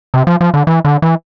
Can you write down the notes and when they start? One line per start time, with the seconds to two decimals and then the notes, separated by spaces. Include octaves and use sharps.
0.14 C3
0.27 F3
0.41 F3
0.54 D3
0.67 E3
0.85 D3
1.02 E3